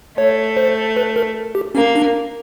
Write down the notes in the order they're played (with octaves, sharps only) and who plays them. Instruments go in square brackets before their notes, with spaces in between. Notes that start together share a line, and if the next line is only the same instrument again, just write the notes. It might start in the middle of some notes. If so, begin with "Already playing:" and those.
[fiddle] A3 [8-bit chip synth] C#5
[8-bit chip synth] C5
B4
A#4
G4
[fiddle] A#3 [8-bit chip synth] C#4
[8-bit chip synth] D4